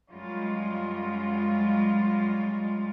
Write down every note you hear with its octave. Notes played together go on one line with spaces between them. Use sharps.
F#2 G3 G#3 F4